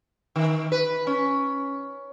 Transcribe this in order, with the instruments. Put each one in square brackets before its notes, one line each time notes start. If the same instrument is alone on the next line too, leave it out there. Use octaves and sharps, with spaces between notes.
[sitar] D#3
B4
C#4